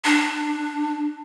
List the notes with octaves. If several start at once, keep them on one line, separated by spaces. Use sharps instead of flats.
D4